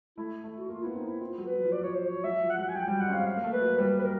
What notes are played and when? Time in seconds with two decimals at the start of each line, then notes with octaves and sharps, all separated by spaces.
0.18 A3 E4
0.44 A3
0.58 F#4
0.69 A#3 F4
0.82 B3 E4
0.95 C4 D#4
1.08 E4
1.21 C4 F4
1.38 F#3
1.47 B4
1.55 F#3
1.64 F3
1.72 D5
1.81 F3 C#5
1.95 C5
2.06 C#5
2.24 F#3 E5
2.41 F3
2.50 F#5
2.58 F#3
2.69 G#5
2.75 F#3 G5
2.88 G3 G5
3.00 G#3 F#5
3.08 C#4
3.13 C4 F5
3.26 F5
3.37 A#3
3.44 A3
3.53 B4
3.61 F#3
3.78 G3 B4
3.99 B4
4.04 A#4